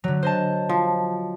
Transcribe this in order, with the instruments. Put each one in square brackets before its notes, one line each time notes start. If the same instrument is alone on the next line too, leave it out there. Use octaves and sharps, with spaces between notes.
[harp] D3 F#3
C5 D#5 A5
[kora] F3